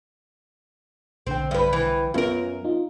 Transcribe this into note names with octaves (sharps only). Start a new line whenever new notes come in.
B1 D3 C4 G5
G2 B4
E3
F#2 B3 C#4 F4 A#4
D#4 F4